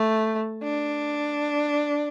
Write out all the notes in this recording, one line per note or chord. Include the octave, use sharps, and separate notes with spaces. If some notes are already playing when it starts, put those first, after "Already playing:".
Already playing: A3
D4